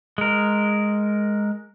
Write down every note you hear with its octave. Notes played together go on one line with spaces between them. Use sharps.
G#3 A#4